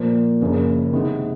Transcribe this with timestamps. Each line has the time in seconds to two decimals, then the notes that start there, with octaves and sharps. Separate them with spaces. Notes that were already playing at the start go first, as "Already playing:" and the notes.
Already playing: A#2 F3 A#3
0.41 F#1 F#2 C#3 F3 A#3
0.93 C3 D#3 G#3 B3